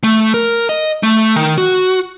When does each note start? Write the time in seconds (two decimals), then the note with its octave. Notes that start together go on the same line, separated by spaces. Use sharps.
0.04 A3
0.34 A#4
0.69 D#5
1.03 A3
1.36 D#3
1.58 F#4